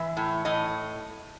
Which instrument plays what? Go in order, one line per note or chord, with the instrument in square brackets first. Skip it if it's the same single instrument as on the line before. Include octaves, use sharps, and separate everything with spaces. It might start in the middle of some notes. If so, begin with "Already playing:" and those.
Already playing: [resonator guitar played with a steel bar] E3 E5
A2
A2 D#5